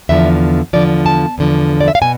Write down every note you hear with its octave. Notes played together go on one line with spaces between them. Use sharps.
E2 D3 F3 E5
E2 D3 F3 D5
A5
E2 D3 F3
D5
E5
F5
B2 G#5